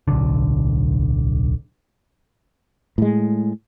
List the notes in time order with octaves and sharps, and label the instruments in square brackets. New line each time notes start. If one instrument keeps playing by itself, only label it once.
[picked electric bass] D1 B1 D3
[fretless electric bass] A2 G#3